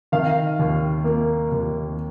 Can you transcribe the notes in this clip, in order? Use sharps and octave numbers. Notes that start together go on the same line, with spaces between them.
D#3 F5
D#2
A#3
D#2